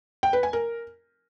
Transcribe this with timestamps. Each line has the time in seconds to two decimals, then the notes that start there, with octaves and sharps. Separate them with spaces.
0.23 G5
0.33 B4
0.43 G#5
0.53 A#4